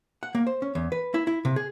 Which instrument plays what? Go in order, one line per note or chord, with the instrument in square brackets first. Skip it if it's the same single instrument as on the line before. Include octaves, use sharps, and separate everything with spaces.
[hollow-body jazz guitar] F#5
A#3
C5
C#4
E2
B4
E4
E4
C3
G#4